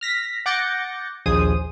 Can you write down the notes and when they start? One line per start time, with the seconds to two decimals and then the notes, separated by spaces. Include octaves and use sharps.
0.01 F6 A#6 B6
0.46 F#5 D6 G6 A6 A#6 C#7
1.26 A#1 D#2 G#4 C5 D#6